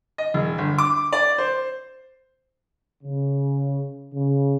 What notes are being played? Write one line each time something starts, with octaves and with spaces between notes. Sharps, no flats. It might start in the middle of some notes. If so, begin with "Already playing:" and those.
D#5
E1
G1
D6
D5
C5
C#3
C#3